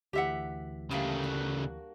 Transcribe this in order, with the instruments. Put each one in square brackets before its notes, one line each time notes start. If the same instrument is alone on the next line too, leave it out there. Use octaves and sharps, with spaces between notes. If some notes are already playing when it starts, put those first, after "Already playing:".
[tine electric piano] D2 E3 [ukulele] G4 E5 F#5
[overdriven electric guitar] C#3 A3 [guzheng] G3 A#3 D4
[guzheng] F#4